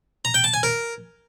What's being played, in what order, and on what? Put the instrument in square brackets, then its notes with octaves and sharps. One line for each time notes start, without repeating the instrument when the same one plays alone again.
[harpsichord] A#5
G5
A5
G#5
A#4